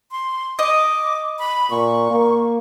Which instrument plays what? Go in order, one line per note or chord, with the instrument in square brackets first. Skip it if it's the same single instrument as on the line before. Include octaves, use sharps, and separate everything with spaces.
[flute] C6
[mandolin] D#5 [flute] D6
[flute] B5
[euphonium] A#2 [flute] C#6
[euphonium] A#3